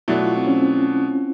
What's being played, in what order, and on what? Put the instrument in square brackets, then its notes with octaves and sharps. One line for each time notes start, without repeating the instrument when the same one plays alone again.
[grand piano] B2 F#3 A3 D4 [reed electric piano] E4
[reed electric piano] F4
C4
C#4
C4